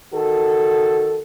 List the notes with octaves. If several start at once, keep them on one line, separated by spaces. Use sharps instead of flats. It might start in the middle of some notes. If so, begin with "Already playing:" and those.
D#3 F#4 A4